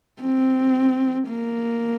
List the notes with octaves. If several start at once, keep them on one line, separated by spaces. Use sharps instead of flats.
C4
A#3